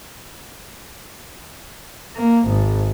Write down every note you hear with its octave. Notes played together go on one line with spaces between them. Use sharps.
A#3
G#1